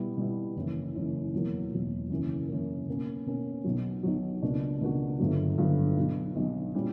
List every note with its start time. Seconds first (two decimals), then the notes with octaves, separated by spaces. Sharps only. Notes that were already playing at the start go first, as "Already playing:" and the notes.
Already playing: B2 G3 B3 E4
0.17 B2 G3 B3 E4
0.56 F#1 F#2 E3
0.94 F#1 F#2 E3
1.33 E1 E2 B2 F#3 A#3
1.71 E1 E2 B2 F#3 A#3
2.10 F#2 C#3 E3 A#3
2.48 F#2 C#3 E3 A#3
2.88 B2 A#3 C#4
3.26 B2 A#3 C#4
3.64 B1 B2 F#3
4.03 B1 B2 F#3
4.42 C#2 B2 A#3 D4 F#4
4.81 C#2 B2 A#3 D4 F#4
5.19 G1 G2 D3 F#3 B3
5.58 G1 G2 D3 F#3 B3
5.97 B1 B2 F#3
6.36 B1 B2 F#3
6.74 A#2 G3 C#4 E4 G4